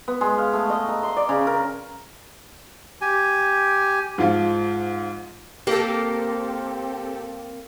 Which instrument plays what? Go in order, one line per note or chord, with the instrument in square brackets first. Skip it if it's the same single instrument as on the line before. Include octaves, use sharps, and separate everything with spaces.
[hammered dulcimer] B3
G#3
F5
A3
D#5
A#5
C6
D5
C#3
A#4
[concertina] G4 G#5
[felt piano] G#2 F3 F4
[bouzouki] A#3 A#4 [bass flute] C4 [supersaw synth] G4 A4